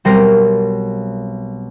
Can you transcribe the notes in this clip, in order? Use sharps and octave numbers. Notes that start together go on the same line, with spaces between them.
B1 G3 C4 A#4 C5 A#6